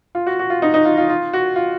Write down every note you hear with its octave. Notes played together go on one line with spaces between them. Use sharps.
F4
F#4
F#4
F4
D#4
D#4
F4
F4
F4
F#4
F4